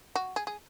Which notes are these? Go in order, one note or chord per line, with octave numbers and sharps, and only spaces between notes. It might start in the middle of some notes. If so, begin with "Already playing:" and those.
F#4
G#4
G#4